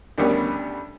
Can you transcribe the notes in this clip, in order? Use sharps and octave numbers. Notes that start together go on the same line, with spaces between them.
D2 D3 D#3 G3 B3 C#4